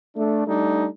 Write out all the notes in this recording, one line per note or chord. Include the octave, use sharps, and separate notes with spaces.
A3 D4
G3 A3 D4 D#4